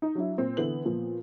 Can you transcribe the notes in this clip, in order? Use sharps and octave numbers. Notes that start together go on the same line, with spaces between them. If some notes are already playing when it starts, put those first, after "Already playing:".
D#4
F#3 D4 E4
A#2 C4
D3 E3 B3 F#7
A#2 F3 B3